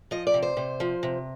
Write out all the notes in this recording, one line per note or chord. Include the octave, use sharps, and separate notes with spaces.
F3 D#5
D5
C3
C5
C3
F3
C3